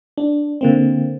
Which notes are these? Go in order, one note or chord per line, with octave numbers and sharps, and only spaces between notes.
D4
D3 A#3 C4